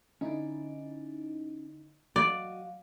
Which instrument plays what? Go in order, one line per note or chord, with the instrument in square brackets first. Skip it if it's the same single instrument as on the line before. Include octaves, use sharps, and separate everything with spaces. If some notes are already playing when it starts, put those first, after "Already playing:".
[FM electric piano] D3 D#4 E4 [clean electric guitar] C#4 D5
[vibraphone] F#3 F5 [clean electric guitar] F#4 D#5 [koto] D5